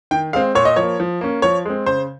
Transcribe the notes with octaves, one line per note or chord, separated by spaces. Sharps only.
D#3 G5
G#3 C4 F5
A#2 C#5
D#5
F3 A#3 C#5
F3
A#3 C#4
F3 C#5
G#3 C4
C#3 C5